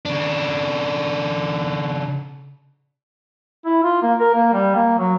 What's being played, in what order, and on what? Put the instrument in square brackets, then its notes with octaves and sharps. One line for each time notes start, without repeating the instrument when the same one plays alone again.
[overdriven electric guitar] C#3 D4
[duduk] E4
F4
A#3
A#4
A#3
G3
A#3
F#3